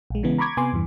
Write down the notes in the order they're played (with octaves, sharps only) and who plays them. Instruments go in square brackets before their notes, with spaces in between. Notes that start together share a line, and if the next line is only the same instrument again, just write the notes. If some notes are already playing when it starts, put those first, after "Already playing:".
[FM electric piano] A#1 G#3
C#3 E3 G#3 B3
A#5 B5 C#6 D6 G#6
C3 B3 G#5 C6 D6
E2 G2 E3